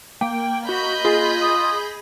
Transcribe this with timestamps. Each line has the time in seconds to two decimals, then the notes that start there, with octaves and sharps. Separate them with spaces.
0.21 A#3 G5
0.69 F#4 D#5 B5 G6
1.05 F4 G#4
1.41 D#6